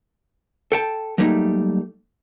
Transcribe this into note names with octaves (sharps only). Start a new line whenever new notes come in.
A4 G5 A5
F#3 G3 A3 A#3 D4 D#4